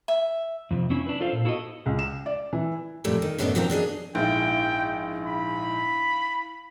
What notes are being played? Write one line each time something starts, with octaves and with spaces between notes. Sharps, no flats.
E5
F2 C3
C4 C#4 E4
D4 B4
F4 A4 C5 F5
A#2
E4 F#4 A4 B4 D#5
C#2
E7
D5
E3
F2 A#2 G3 A3 D4
D#3
F#2 A2 B3 D4 A4 D#5
B2 D#3 A#3 C4 F4 A#4
F#3 D4 G#4 D#5
A#1 G#2 E4 F5 G5
B5